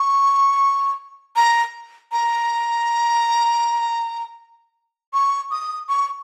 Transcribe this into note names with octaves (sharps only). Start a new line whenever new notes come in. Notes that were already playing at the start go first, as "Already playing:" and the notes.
Already playing: C#6
A#5
A#5
C#6
D#6
C#6